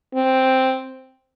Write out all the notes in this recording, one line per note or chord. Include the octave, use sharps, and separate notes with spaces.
C4